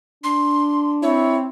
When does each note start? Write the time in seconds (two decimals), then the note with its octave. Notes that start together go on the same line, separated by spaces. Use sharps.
0.24 D4 C6
1.03 C4 E4 C#5